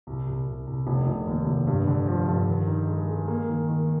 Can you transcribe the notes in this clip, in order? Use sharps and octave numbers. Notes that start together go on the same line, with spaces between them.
C2
C2
C2
C2
F1
F1
D#2
F1
G2
D3
F3
G2
D#3
D#4
G#3
G#3
A#3
D#3
D#3